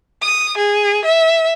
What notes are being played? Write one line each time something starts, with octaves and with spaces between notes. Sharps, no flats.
D#6
G#4
E5